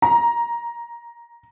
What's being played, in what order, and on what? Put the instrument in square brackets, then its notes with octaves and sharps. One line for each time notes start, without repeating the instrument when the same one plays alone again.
[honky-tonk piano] A#5